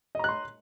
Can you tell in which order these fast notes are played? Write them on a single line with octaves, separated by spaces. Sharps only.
D#5 A#5 F#6 C6